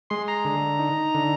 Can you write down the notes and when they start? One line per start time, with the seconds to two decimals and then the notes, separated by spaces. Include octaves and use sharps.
0.10 G#3 C6
0.28 A#5
0.45 D3
0.79 D#4
1.15 D3